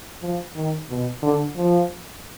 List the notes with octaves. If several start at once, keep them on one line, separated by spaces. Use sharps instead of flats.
F3
D#3
B2
D3
F3